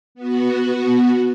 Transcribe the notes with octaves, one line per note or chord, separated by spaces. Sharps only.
B3 F#4